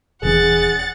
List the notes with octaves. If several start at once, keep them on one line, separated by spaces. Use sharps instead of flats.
D#1 E3 C#4 G#4 F#5 A6